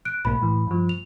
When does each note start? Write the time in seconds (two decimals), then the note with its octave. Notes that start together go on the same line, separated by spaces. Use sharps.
0.05 F#6 D7
0.25 B1 G#2 A#3 B5
0.42 A2 E3
0.67 G2 F3
0.89 F7